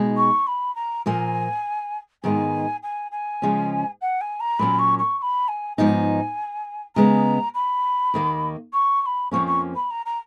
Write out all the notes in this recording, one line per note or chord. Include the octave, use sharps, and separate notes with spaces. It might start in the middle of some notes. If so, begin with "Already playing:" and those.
Already playing: B2 G#3 D#4
C#6
B5
A#5
A#2 F3 A#3 G#5
G#2 D#3 G#3 B3 D#4 G#5
G#5
G#5
C#3 F3 G#3 C#4
F#5
G#5
A#5
A#2 F#3 A#3 C#4 B5
C#6
C#6
C#6
B5
G#5
G#2 F3 B3 D#4 G#5
C#3 G#3 B3 A#5
B5
D#2 D#3 A#3
C#6
C#6
B5
F2 F3 A#3 C#4 C#6
C#6
B5
A#5
A#5